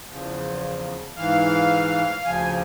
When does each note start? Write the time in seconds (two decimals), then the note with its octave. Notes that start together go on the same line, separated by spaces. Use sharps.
0.07 E2 C#3 F3
1.16 G#2 E3 F5
2.25 D2 C#3 F3 G#5